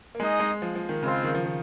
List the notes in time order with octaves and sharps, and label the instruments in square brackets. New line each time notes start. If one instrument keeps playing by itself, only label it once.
[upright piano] A#3
[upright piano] G#3 [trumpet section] D#4 G#4 D#5
[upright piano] G#3
F3
F3
D#3
[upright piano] C#3 [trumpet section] G#3 C4 F4
[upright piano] D#3
F3
D#3